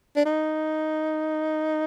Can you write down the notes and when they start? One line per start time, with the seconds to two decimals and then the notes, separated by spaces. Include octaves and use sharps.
0.16 D4
0.25 D#4